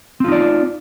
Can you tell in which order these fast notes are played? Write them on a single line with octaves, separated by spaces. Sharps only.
C4 F4 D#4 D5